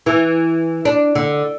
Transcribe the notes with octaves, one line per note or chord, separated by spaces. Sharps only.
E3
D4
D3